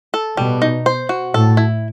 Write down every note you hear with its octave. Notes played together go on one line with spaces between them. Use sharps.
A4
B2 G3
D#4
C5
F#4
A2 A4
E4